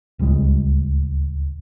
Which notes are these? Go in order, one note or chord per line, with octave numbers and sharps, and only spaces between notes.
D1 C#2 G3 G#3